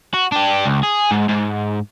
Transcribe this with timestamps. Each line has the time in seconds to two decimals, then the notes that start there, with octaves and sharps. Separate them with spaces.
0.14 F#4
0.32 D4 G4
0.66 C#2
0.83 G#4
1.11 G#2
1.29 G#2